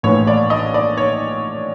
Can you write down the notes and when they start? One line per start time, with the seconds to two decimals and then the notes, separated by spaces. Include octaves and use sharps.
0.03 A#1 A2 E3 C#5
0.27 D5
0.50 D#5
0.74 D5
0.97 C#5